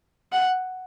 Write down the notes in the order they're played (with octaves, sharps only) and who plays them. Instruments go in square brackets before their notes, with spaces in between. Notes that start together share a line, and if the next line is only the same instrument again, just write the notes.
[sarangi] F#5